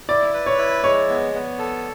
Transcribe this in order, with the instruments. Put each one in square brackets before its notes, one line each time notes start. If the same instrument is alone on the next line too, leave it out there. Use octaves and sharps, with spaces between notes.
[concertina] E4 [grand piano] D5
[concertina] B4
[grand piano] C#5
[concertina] E4
[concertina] G#3 [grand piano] C#5
[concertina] B3
B3
A4